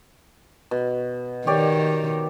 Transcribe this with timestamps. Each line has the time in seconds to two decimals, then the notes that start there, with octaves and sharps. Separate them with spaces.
0.71 B2
1.47 D#3 G4 C#5 D5